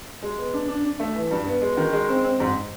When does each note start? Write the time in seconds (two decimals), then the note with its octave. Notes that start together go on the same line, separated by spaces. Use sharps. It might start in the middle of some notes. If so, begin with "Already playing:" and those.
0.23 G#3
0.38 B3
0.54 D4
0.68 D4
0.85 D4
1.00 A3
1.15 E3
1.31 G2
1.46 B3
1.62 G#3
1.77 D#3
1.93 G#3
2.08 C4
2.25 C4
2.40 G#2